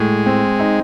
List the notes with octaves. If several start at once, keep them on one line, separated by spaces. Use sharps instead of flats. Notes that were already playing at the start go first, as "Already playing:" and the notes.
Already playing: A2 G#3
C4
D#4